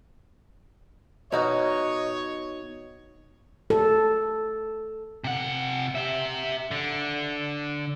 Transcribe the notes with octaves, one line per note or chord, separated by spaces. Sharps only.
B2 D#4 F#4 C#5 D#5
A4
C3 F#5
G4 E5
D3